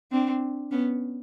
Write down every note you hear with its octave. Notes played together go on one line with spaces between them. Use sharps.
C4 D4
B3 C#4